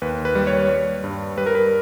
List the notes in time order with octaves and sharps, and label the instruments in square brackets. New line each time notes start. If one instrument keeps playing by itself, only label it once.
[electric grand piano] D#2 B4
B4
G3
C#5
G3
G2
G3 B4
A#4
B4